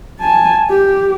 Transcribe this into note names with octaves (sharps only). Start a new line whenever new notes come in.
G#5 A5
G4